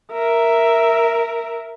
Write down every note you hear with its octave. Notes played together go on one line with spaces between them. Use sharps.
A#4 E5